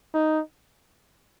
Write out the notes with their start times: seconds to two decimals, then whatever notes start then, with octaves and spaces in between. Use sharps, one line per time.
0.14 D#4